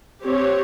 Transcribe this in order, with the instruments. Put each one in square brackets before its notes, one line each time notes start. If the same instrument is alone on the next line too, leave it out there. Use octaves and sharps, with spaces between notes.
[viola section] C4 G4 C#5